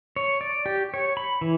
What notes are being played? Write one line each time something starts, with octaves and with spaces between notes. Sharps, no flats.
C#5
D5
G4
C#5
B5
E3